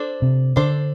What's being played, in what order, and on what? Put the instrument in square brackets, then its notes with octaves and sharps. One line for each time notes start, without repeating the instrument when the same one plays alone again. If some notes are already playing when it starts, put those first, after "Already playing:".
Already playing: [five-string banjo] D4 A4 C5
[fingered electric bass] C3
[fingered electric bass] D3 [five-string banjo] D4 A4 C5